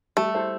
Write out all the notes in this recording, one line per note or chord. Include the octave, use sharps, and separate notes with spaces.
G3 A3
E4 A4 C5